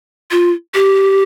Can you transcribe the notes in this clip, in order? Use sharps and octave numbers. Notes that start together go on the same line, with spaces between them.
F4
G4